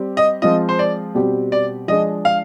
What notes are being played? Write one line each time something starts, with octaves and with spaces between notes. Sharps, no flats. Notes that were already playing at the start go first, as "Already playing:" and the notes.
Already playing: G3 C4 G4
D#5
F3 G#3 C4 F4 D#5
C5
D5
B2 G3 C4 G4
D5
F3 G#3 D4 G#4 D#5
F5